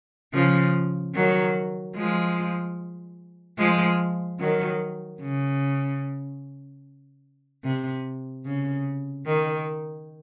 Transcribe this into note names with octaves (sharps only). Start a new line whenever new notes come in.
C#3 F3
D#3 F#3
F3 G#3
F3 G#3
D#3 F#3
C#3
C3
C#3
D#3